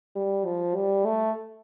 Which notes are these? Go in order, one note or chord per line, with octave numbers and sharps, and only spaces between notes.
G3
F3
G3
A3